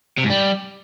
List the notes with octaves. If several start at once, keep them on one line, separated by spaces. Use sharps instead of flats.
C3
G#2
G3